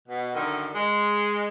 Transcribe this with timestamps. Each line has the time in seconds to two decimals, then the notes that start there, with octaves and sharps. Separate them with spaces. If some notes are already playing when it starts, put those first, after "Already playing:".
0.09 B2
0.34 F#2 D3 D#3
0.75 G#3